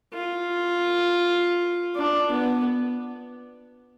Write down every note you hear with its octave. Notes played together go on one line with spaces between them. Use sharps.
F4
D4
B3